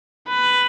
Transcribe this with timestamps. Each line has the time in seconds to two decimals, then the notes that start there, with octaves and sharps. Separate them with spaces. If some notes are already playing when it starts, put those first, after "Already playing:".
0.28 B4